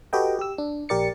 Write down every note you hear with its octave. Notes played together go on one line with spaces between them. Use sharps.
F#4 G4 A4 B4 D#5 G5
G4 E6
D4
A#1 G4 A#4 D5 A6 C#7